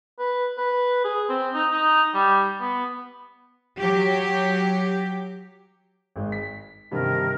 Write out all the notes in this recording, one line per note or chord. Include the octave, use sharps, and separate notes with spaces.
B4
B4
G#4
C4
D#4
D#4
G3
B3
F#3 G4
G#1 G#3
B6
G2 C3 D#3 A#4